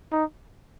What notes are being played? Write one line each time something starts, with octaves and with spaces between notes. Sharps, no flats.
D#4